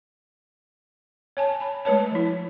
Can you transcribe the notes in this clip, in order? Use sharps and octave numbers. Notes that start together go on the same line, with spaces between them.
C#5 G#5 A5
A5 B5
G#3 A3 B4 C#5 A5
F3 E4